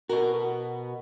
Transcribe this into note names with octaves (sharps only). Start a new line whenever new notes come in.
B2 F#4 A#4